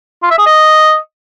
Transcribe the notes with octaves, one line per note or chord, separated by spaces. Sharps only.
F4
E5
G#4
D#5